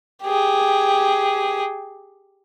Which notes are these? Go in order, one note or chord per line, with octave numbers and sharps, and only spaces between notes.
G4 G#4